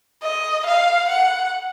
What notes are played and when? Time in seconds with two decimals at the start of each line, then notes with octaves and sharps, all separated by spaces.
0.23 D#5
0.66 F5
1.09 F#5